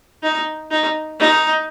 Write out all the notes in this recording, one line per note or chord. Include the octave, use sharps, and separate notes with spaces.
D#4
D#4
D#4